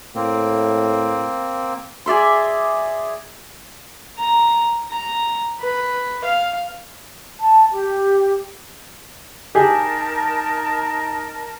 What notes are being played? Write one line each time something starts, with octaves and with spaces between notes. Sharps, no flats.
A2 A#3 C4
G#4 D5 E5 C6
A#5
A#5
B4
F5
A5
G4
D#4 G4 G#4 A#4 A5